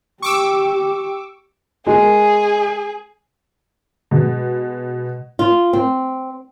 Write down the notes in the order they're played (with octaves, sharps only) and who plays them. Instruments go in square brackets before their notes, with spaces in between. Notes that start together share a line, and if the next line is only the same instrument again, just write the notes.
[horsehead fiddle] G4 [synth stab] C#6 D6 E6
[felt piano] G#3 A#4 [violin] G#4
[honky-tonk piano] B2 G#3
[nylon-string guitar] F4
C4